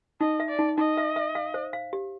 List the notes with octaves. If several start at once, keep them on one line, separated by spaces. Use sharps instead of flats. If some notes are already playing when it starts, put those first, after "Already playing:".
D#4 D#5
E5
D5
D#4
D#4 D#5
E5
E5
F5
C5
F5
G4